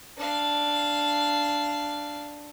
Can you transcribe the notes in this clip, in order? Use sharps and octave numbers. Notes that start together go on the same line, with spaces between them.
D4 F5